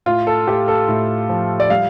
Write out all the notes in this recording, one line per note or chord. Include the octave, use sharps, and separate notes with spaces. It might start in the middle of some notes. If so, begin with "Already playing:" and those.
A2 F4
A4
A2 G4
A4
A2
F3
D5
G3 F5